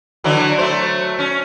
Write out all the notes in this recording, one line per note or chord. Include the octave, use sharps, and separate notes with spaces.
D3 E3 F#3
F#3 A3 C5
C#4